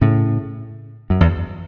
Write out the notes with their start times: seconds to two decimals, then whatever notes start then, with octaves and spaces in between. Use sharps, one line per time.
0.01 A2 C#3
1.10 F#2
1.21 E2